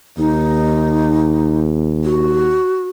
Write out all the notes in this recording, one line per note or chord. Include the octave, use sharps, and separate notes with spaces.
D#2 D#4
F#4